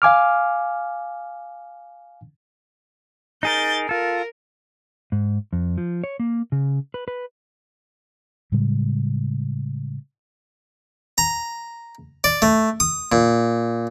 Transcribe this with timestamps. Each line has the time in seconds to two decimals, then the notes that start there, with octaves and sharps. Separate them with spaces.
0.02 F5 G#5 D6 F6
3.43 D#4 G#4 A#4 G6 A6
3.89 F4 A4 A#4
5.12 G#2
5.53 F2
5.78 F3
6.04 C#5
6.20 A#3
6.52 C#3
6.94 B4
7.08 B4
8.52 A2 C#3 G3 G#3
11.18 A#5
12.24 D5
12.42 A3
12.80 D#6
13.12 A#2